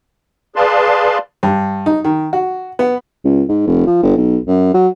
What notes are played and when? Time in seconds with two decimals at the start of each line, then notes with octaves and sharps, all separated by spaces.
0.56 G#4 B4 D5 F5 A5 C6
1.43 G2
1.86 D#4
2.05 D#3
2.33 F#4
2.79 B3
3.25 C#2
3.49 G#2
3.67 F1
3.87 F3
4.03 G1
4.17 B1
4.47 F#2
4.74 F#3